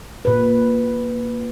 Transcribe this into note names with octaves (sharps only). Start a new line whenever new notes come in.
A#2 B4